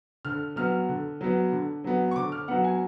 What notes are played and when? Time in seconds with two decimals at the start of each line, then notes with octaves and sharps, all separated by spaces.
0.25 D3 F6
0.56 F#3 B3 F6
0.89 D3
1.21 F#3 B3
1.52 D3
1.84 F#3 B3
2.11 C#6
2.16 D3 D6
2.32 F6
2.48 F#3 B3 F#5
2.64 G#5